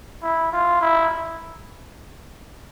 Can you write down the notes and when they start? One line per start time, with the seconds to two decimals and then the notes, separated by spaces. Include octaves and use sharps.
0.23 E4
0.52 F4
0.81 E4